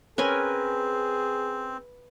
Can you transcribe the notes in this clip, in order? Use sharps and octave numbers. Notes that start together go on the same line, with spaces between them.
C4 C#4 G#4 A#4 B4 G#5